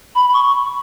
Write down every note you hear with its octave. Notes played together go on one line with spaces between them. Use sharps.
B5
C#6